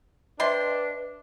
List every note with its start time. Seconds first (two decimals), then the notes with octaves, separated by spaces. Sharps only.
0.40 C4 D4 B4 D#5 E5 A5 C6